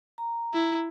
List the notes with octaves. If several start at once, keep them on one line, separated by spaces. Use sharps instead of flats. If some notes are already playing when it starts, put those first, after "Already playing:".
A#5
E4